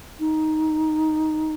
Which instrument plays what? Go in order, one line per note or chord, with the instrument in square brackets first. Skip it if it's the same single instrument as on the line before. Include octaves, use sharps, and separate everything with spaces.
[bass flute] D#4